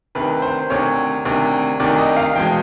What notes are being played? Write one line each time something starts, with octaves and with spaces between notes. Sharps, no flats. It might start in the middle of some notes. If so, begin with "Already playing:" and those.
D2 C3 D#3 B4
C5
D2 C3 D#3 C#5
D2 C3 D#3
D2 C3 D#3 D5
D#5
F5
E2 B2 G#3 G5